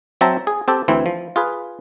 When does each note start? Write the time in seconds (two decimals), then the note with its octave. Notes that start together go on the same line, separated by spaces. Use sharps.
0.21 F#3 C4 E5 G5 A5 A#5
0.47 G#4
0.68 C4 G4 A4
0.88 D2 E3 C4 E4
1.06 F3
1.36 F4 G#4 B4